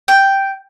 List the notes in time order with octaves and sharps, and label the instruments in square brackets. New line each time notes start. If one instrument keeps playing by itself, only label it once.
[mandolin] G5